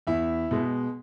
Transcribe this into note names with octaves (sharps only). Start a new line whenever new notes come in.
E2 E4 E5
B2 G#3